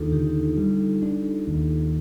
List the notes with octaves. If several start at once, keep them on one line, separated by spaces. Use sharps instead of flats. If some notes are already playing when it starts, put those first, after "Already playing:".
Already playing: D#2 D4 D#4 F4 A4
D3 D#4 G4
G3
D4
D#2